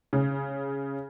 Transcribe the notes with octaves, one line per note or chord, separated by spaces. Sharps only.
C#3